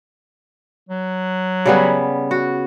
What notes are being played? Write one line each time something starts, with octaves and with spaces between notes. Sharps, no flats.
F#3
C#3 G3 B3
F#4